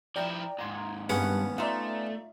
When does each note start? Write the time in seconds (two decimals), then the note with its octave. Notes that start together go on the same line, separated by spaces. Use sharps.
0.16 F3 E4 D5 G5 A#5
0.59 D#2 G#2 A#5 C6 G#6
1.09 G2 G#3 A#3 B3 C#4 F#5
1.58 A3 D#4 F4 D5 E5 F5